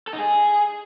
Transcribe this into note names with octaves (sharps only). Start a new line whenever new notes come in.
A4
D#4
G#4